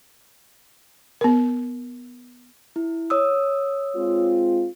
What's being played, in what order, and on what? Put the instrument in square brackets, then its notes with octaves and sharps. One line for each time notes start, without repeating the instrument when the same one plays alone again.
[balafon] B3 A#4
[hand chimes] E4
C#5 D#6 E6
[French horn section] G#3 C4 F4